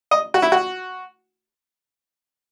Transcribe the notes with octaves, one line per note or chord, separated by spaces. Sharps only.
D#5
F#4
E4
F#4